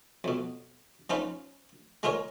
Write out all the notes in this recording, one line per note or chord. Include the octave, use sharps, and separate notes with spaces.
F2 B2
F3 C#4 D#4 F4 B4
G#3 F4 G#4 A#4 C#5